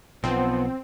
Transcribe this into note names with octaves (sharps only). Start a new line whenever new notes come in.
B1 F3 B3 C4